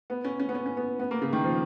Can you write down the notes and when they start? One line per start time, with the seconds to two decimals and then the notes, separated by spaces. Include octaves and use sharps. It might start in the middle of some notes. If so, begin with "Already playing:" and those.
0.10 B3
0.24 C#4
0.39 C#4
0.49 B3
0.55 C#4
0.66 C#4
0.77 B3
0.99 B3
1.11 A#3
1.22 C#3
1.33 D#3
1.44 F3